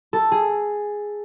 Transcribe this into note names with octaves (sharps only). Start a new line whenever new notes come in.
A4
G#4